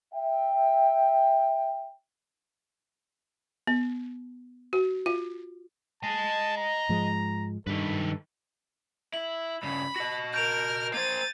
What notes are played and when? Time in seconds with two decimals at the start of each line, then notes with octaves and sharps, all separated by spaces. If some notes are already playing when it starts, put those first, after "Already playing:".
0.13 E5 G5
3.67 B3
4.73 F#4
5.06 F4
6.03 D#5 G#5 A5
6.57 A#5
6.89 G#2 F3 G#3
7.67 G2 D#3 A4 B4
9.14 E4 F#7
9.63 G2 C#3 B5
9.96 F#4 D#5 A#6 F#7
10.34 A#4 F6 G6 D7 F7
10.94 A#3 C5 G#6 A6 D#7